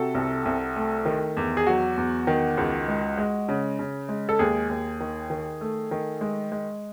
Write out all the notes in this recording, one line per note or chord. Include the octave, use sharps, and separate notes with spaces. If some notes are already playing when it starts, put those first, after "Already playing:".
Already playing: C3 F#4 A4
C2
C2
A3
D#3
E2
G#4
F#3 F#4
E2
D#3
C#2
G#3
G#3
C#3
C#3
G#3
A4
D#2 G#4
D#2
D#3
D#3
A3
D#3
G#3
G#3